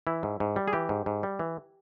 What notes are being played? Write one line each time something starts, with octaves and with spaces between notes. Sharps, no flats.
E3 E4
G#2
G#2
G3
G#4
E3 G4
G#2
G#2
G3
E3